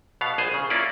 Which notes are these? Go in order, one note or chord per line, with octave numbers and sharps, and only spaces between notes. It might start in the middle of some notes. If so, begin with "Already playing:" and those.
B2 B3 F5
A#1 G#4 C5
C#3
A#3 C#4 E4 F4 D5